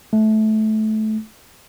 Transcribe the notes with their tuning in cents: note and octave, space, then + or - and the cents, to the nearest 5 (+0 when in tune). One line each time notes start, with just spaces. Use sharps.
A3 -20